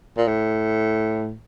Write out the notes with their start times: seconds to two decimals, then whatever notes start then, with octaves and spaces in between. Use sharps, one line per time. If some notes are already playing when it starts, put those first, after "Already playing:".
0.18 A#2
0.28 A2